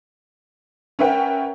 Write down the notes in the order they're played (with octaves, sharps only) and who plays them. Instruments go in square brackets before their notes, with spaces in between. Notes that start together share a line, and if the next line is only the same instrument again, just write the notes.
[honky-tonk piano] C#4 A#4 B4 E5 F#5 G5